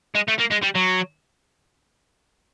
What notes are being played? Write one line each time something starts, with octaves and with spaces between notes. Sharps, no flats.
G#3
A3
A#3
G#3
G3
F#3